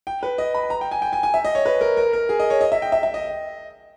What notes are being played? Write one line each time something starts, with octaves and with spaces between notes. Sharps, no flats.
G5
B4
D#5
B5
A#5
G5
G#5
G5
G#5
G#5
E5
D#5
C#5
B4
A#4
A#4
A#4
G#4
D#5
C#5
D#5
E5
G5
E5
E5
D#5